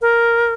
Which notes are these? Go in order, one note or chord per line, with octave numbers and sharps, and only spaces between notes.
A#4